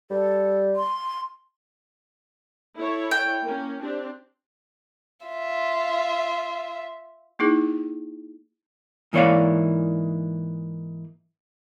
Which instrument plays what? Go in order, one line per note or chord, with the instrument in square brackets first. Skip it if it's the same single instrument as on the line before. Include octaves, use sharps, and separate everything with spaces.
[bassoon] G3 [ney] A4
[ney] C6
[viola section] E4 A4 C#5
[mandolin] G5
[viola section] A#3 C#4
C4 D4 G4
[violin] F4 E5
[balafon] A#3 D#4 E4 G#4
[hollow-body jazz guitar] G#2 E3 A#3 C#5 D5 F5